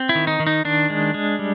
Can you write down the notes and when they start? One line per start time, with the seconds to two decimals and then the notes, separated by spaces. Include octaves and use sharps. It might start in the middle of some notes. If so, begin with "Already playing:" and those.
Already playing: C4
0.09 E4
0.15 D#3
0.27 D#4
0.40 D#3
0.47 D#4
0.65 D#3 D4
0.90 G#3
1.14 G#3
1.39 G3